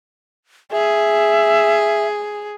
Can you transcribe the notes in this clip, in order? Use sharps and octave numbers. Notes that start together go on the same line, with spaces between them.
G#4 E5